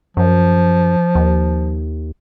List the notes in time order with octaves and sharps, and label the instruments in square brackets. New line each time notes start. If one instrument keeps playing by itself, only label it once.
[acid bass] F#2 [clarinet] F3
[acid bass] D#2